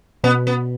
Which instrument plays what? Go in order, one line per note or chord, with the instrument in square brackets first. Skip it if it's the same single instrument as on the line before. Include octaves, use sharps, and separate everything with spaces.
[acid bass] B2 [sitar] B3
[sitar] B3